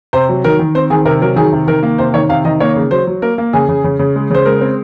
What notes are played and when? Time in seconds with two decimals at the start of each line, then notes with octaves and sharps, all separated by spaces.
0.13 C3 C5
0.29 F#3
0.44 D#3 A#4
0.59 D#3
0.75 C4 C5
0.90 D#3 G#4
1.05 C3 A#4
1.21 F#3 A#4
1.36 D#3 G#4
1.53 C3
1.68 D#3 A#4
1.83 A#3
1.98 C3 C5
2.14 D#3 C#5
2.29 C3 F5
2.45 D#3 D#5
2.60 A#3 C#5
2.76 C#3
2.91 F#3 C5
3.07 F#3
3.22 A#3 A#4
3.38 A#3
3.53 C#3 G#4
3.69 C#3
3.84 C#3
3.99 C#3
4.16 G#3
4.31 C#3 C5
4.46 G#3 A#4
4.61 C4